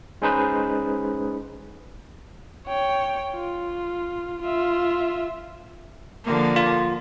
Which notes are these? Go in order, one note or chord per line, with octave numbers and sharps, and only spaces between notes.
G#3 C#4 D#4 G#4 B4 C5
C#5 G5
F4
F4 E5
D3 F3 A#3
F4